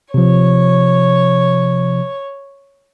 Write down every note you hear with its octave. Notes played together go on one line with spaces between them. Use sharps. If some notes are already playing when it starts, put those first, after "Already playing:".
C3 F3 C#5